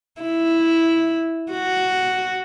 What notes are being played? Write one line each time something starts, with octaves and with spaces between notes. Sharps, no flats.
E4
F#4